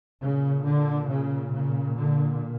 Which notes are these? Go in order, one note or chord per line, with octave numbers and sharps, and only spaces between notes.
A#2 C#3
D3
C#3
C#3
D3